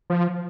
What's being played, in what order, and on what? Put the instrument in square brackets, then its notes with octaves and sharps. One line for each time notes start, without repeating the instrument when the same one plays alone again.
[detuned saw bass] F3